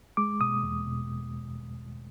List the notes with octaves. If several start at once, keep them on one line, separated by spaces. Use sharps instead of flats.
G#3 D6
B2 D#6
E2
B2